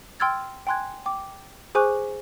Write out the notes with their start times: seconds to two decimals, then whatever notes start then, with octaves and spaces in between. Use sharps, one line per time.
0.20 G5 C6 E6 F6 G#6 A6
0.67 G5 G#5 C6 F#6 G#6
1.06 G5 D6
1.75 G#4 C5 G#5 C#6 D6 F#6